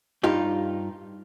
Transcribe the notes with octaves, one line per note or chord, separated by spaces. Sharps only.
G2 D#4 F4 G4